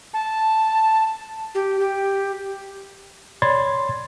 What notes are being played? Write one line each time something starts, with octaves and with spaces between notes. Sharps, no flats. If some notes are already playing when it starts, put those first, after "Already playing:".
A5
G4
G4
C#5 D5 B5 C6 G#6 A6